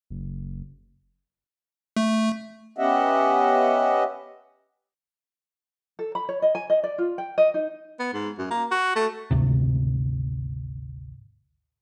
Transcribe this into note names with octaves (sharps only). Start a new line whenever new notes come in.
F#1
A3
B3 C#4 G4 D#5 E5 F#5
A4
B5
C#5
D#5
G#5
D#5
D5
F4
G5
D#5
D#4
B3
G#2
F#2
A#3
F#4
A3
G#1 D2 C3